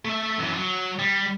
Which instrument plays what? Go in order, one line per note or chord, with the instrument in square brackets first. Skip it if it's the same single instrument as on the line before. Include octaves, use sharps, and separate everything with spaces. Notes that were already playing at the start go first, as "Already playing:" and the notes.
[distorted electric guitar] A3 E5
F#2 E3
F#3
G3